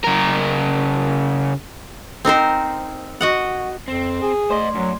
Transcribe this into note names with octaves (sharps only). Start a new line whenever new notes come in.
C#3 A#4
C4 D#4 A#4 C5
F#4 D#5 F#5
F2 C4
G#4
A3 C5 D5 D#5 C6
F#2 F#3